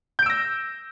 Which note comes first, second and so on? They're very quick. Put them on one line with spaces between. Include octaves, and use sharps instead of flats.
G6 D7 E6 A#6